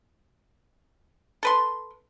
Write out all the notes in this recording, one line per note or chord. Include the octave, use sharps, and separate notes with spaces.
A4 B4 C6